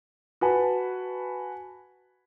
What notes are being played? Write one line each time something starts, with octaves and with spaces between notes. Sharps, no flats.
F#4 B4 G#5 A5